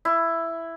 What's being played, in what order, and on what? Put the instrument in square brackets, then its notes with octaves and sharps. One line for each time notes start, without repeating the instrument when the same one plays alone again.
[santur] E4